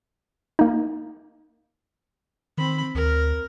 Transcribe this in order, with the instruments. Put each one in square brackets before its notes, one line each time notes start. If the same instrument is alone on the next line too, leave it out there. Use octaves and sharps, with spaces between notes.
[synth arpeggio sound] A#3 D#4
[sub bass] D#3 [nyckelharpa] C4 B5
[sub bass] D2 [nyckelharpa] A#4